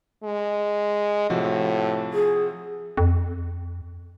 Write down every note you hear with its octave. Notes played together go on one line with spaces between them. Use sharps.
G#3
A2 C3 F3 F#4
G#4
F2